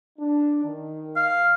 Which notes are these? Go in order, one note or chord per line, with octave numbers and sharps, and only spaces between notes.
D4
D#3
F5